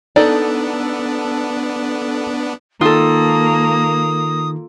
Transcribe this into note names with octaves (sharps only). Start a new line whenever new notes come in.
B3 D4 D#4 A4 D5
D#3 A#3 F4 A4 D#6